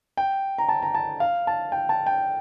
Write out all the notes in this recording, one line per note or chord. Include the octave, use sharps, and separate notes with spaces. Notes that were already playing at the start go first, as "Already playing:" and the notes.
G5
A#5
A5
A#5
A5
F5
A5
G5
A5
G5